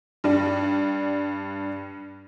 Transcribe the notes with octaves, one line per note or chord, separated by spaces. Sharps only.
G2 D4